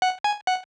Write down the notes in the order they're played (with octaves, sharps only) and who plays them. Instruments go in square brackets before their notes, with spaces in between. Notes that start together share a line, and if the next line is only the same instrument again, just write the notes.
[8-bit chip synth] F#5
G#5
F#5